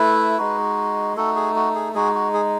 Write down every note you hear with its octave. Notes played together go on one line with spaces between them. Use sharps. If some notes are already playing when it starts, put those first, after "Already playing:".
Already playing: A3 E4 B4
G#3 D#4 F#4
A3 D#4 F#4 A4
G#4
F#4
G#4
G#3 D#4 F#4 G#4
F#4
G#4